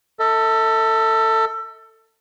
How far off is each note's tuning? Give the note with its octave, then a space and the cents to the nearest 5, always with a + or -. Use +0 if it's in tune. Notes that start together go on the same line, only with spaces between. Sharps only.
A4 +25 E5 -40